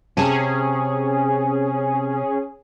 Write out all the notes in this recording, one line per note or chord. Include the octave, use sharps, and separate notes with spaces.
C3 C#4 G#4 G#5 A5